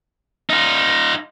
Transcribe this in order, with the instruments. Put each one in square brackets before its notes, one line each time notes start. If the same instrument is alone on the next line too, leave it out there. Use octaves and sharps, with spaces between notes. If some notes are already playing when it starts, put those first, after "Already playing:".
[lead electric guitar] D#4 F4